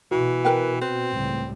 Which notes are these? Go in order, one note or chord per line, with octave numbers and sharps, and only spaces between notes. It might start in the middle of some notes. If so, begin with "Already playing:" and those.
B2 E3 F#4
A#4 B4 G5
C4 B4
C#2 A2 G3